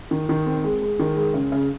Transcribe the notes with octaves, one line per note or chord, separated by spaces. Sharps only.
D#3
D#3
C4
G#3
G#3
D#3
G#3
C#3
C#3